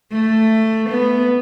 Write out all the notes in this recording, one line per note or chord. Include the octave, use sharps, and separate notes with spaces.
A3
B3